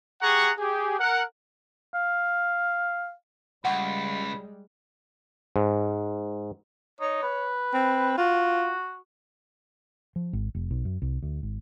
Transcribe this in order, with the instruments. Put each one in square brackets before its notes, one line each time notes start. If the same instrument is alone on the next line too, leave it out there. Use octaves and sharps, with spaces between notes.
[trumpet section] G4 G#4 F#5 A#5 C#6
G4 G#4
A#4 F#5
[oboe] F5
[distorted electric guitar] C#2 [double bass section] G3 G#3 [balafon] F#5 [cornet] B5
[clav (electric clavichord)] G#2
[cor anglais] D#4 [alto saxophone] C#5
[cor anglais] B4
[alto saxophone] C4
[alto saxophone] F4 [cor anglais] F#4
[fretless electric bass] F3
G#1
F1
B1
F#2
C2
D2
G#1